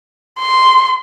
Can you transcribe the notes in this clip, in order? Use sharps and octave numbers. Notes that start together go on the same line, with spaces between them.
C6